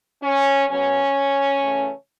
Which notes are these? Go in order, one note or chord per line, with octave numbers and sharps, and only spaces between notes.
C#4
C#3 F#3 B3 C#4
C#3 E3 A3